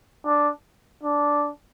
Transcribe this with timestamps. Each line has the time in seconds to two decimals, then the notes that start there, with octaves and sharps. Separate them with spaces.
0.26 D4
1.03 D4